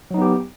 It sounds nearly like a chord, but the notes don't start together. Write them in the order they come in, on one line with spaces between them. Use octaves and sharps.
F#3 D#4 B3 G4